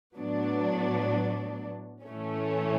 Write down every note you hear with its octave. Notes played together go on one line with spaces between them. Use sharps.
A2 F#3 B3 D4
A2 E3 A3 C#4